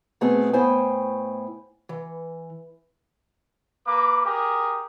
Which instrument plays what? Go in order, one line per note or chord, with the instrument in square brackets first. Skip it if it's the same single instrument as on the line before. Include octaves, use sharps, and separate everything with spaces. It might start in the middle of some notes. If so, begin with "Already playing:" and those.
[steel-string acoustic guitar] B2 A3 B3 C4 G#4 A4
A2 B3 E4 C5 G5 G#5
E3
[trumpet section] A#3 B4 D6
G4 G#4 A#4